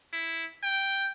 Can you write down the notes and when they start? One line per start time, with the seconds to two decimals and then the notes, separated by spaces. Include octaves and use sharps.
0.13 E4
0.63 G5